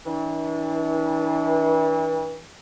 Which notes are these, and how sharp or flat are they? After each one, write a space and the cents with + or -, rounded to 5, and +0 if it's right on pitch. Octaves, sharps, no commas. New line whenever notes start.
E3 -35 D4 -20